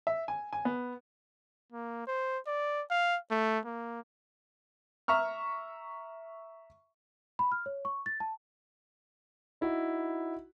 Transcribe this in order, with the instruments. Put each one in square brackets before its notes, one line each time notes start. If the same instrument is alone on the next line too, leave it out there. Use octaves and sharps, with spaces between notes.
[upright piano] E5
G#5
G#5
B3
[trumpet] A#3
C5
D5
F5
A3
A#3
[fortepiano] E5 A#5 C#6 F6
[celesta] B5
F6
C#5
C#6
A6
A5
[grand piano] D#4 E4 F#4